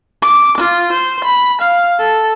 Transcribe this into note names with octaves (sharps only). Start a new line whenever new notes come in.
D6
F4
C5
B5
F5
A4